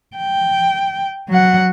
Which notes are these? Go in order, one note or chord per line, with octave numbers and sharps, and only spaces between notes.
G5
F#3 F#5